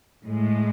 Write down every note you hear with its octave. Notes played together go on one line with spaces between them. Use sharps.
A2 G#3